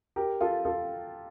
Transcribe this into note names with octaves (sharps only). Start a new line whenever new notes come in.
G4 A#4
F4 A4
F4 A4